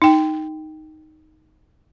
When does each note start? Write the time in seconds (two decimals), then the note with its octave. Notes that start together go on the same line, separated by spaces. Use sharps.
0.02 D#4 G5